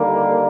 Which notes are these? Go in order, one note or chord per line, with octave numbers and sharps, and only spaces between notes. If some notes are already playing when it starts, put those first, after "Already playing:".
Already playing: D#2 D3 G3 A#3